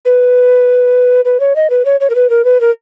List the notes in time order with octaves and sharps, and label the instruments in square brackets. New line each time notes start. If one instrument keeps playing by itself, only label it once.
[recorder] B4
B4
C#5
D#5
B4
C#5
C#5
A#4
B4
A#4
B4
A#4